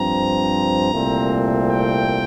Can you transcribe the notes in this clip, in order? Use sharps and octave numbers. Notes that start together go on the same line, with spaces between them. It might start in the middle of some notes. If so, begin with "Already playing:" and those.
Already playing: G2 F3 C4 A#5
C2 A#2 A3 C4
G5